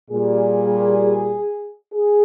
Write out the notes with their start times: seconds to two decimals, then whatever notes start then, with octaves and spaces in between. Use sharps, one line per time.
0.10 A#2 G3 G#4
1.93 G#4